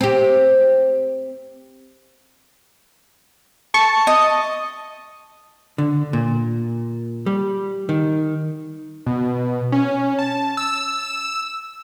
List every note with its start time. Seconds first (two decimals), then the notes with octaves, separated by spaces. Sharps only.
0.01 C4 G4
3.74 A5 C#6
4.07 D#5
5.78 D3
6.13 A#2
7.26 G3
7.89 D#3
9.06 B2
9.72 C#4
10.19 A5
10.57 E6